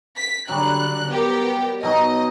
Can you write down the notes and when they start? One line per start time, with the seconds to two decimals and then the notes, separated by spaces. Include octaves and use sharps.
0.17 B6
0.49 D3 F#3 G3 F#6
1.12 B3 G4 A#4
1.83 B2 F#3 D#4 D#5